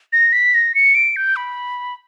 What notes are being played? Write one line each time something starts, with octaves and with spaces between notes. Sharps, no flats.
A#6
B6
A#6
C#7
D7
G6
B5